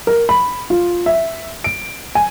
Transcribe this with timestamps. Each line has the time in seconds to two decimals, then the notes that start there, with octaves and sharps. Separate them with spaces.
0.07 A#4
0.29 B5
0.70 F4
1.06 E5
1.64 D7
2.15 G#5